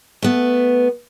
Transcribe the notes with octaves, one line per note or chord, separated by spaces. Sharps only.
A3 B3